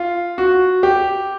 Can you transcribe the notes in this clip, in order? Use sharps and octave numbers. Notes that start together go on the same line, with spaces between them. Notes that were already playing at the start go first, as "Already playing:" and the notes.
Already playing: F4
F#4
G4